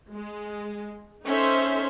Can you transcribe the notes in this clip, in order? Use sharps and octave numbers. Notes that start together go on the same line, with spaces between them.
G#3
C#4 D#4 A4 C5 E5 C6